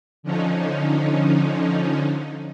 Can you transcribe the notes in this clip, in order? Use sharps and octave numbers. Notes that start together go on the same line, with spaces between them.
D3 F3 C#4 D#4